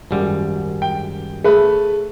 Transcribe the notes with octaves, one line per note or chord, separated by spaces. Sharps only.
G#1 F#2 G3
G5
A3 G#4 B4